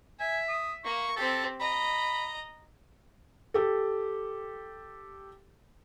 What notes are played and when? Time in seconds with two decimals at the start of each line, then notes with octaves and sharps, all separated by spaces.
0.20 E5 G#5
0.48 D#6
0.84 A#3 C#6
1.16 C4 G4 A4
1.60 D#5 A#5 B5
3.54 G4 A4